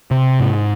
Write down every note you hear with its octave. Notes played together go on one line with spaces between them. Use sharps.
C3
G#2